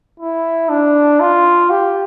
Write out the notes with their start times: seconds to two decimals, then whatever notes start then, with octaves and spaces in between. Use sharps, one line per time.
0.20 E4
0.69 D4
1.20 F4
1.70 G4